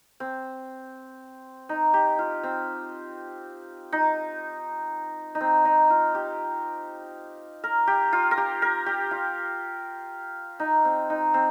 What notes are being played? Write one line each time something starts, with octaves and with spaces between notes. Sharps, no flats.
C4
D#4
G4
F4
C4
D#4
D#4
C4
D#4
F4
G4
A#4
G4
F4
A#4
G4
A#4
G4
F4
D#4
C4
D#4
C4